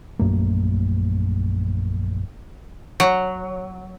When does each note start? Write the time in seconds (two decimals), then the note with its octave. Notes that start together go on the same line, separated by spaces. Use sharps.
0.19 A#1 F#2 A3 A#3
3.00 F#3